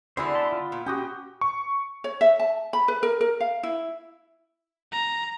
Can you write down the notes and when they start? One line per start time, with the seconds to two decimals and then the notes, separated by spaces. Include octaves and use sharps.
0.17 D3 B3 D4 E4 F#4 G#4 C5
0.35 E5 A5 C6
0.52 F4
0.72 A#2
0.86 C#4 F#4 G4 G5 D#6
1.41 C#6
2.04 C#5
2.21 E5
2.40 A5
2.73 B5
2.88 B4
3.03 A#4
3.21 A#4
3.40 F5
3.63 E4
4.93 A#5